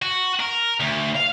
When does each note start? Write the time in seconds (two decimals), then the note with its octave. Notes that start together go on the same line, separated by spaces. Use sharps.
0.02 F#4
0.39 A#4
0.80 D2
1.15 F5